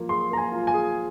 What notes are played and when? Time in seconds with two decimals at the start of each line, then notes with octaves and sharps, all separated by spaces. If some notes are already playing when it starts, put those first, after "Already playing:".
Already playing: F3 A#3 F4
0.09 G#4 C6
0.31 A#3 A#5
0.38 G#5
0.52 F4
0.67 G#5
0.74 G#4